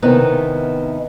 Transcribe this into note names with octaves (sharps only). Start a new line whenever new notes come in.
C3 D#3 B3 C#4 D#4 E4